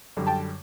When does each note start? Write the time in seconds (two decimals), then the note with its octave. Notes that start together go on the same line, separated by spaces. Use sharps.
0.17 F#2 D3 G3
0.27 G5 A5